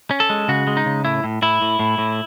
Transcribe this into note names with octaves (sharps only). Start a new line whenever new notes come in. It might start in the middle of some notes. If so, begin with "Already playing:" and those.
C#4
A4
G#3
C#3 F#4
G#3
D#4
C#3
A2 E4
A2
A2 E4
A2
A2
A2